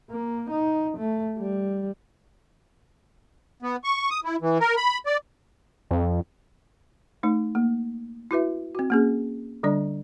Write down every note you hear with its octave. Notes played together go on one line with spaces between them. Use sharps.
A#3
D#4
A3
G3
B3
C#6
D#6
E4
E3
A#4
B5
D5
F2
A3 D#4
A#3
E4 F#4 B4 E5
C4 F#4
A#3 C#4 G#4
D3 G3 D4 D5